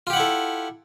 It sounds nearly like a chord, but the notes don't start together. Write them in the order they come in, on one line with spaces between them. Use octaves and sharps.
F4 G4 F#5 E4 A4